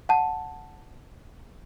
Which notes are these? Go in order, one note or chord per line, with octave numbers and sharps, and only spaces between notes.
F#5 A5